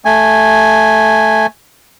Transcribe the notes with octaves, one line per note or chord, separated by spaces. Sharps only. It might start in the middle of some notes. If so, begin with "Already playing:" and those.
A3 G#5